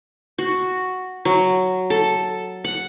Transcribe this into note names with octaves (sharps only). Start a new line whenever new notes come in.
F#4
F#3
A4
F#5